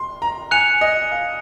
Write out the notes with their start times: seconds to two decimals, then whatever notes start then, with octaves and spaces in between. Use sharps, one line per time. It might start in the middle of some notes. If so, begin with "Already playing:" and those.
Already playing: C6
0.22 A#5
0.51 G#5 F#6 C#7 F7
0.81 D#5
1.11 F5